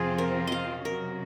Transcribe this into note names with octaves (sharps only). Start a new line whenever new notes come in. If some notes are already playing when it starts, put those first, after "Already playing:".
Already playing: F2 C3 F3 C4 F4 G#4 C5
A#4
D#5 F5
C3 F#3 C#4 F#4 A#4